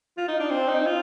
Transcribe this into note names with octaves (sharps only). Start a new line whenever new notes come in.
F4
D#4
D4
C4
D#4
F4